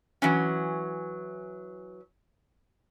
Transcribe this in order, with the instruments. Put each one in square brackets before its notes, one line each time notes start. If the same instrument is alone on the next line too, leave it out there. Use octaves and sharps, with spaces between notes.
[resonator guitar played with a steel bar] E3 F#3 C#4